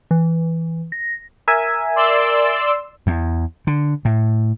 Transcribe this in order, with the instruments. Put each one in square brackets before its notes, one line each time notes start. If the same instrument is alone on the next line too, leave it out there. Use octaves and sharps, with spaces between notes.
[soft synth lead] E3
A#6
[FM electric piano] A#4 E5 G#5
[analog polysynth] D5 C6 E6
[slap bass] E2
D3
A2